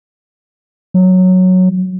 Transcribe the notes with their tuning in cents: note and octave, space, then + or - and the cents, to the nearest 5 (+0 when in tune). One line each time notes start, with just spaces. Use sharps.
F#3 -5